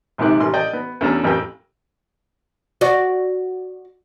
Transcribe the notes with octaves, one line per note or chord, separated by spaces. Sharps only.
A#1 G#2 C3 D#3 G4 F#6
A1 C6
D5 D#5 G5
B3
E2 A3 C#4 D4 A#5 E6
A1 F2 A#4 G5 E6
F#4 D5